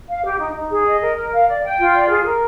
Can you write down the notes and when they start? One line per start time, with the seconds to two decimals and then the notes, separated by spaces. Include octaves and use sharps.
0.08 F5
0.24 G4
0.40 D#4
0.55 D#4
0.71 G#4
0.86 D#5
1.01 A#4
1.17 A#4
1.33 F5
1.48 D5
1.64 G5
1.80 F4
1.94 D5
2.10 G#4
2.25 A#4